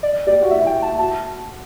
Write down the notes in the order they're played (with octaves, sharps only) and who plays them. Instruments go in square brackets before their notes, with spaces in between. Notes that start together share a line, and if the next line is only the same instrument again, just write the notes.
[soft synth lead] D5
[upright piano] G4 [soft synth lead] D5
[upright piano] F#4
[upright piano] E4 [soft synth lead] E5
[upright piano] E4
[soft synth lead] G5
A5
[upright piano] E4
[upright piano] F#4 [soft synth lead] A5